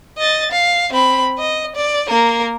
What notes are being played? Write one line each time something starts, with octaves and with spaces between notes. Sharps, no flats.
D#5 A6
F5
C4 B5
D#5
D5
A#3 A#4